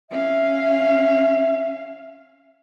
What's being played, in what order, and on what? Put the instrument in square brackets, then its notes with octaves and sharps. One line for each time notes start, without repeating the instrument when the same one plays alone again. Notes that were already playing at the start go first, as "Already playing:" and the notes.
[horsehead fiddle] C#4 F5 [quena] E5